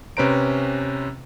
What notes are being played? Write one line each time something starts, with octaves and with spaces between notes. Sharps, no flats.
C3 C#4 B4 C5 A#5 D7